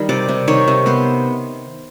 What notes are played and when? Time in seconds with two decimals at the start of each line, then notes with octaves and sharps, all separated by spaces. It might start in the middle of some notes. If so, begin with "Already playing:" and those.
Already playing: D#3 G3
0.09 C3 D5
0.29 C3
0.48 D#3 C#5
0.68 C3
0.86 B3 C5